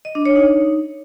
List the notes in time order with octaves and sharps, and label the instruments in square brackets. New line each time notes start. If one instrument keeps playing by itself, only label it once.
[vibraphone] D#5
D4
C#5
D#4